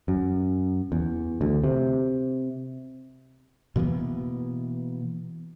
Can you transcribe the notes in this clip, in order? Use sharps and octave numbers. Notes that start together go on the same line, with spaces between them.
F#2
E2
D2
C3
B2 E3 A#3 B3